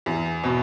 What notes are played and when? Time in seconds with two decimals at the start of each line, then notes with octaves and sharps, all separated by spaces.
0.06 E2
0.44 B2